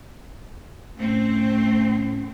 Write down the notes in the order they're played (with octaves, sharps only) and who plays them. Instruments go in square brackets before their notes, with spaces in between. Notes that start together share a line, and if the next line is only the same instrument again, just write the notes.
[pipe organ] A2 C#4 [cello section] A3 C4